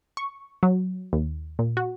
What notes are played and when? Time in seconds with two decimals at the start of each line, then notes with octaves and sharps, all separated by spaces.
0.17 C#6
0.63 F#3
1.13 D#2
1.59 A#2
1.77 F#4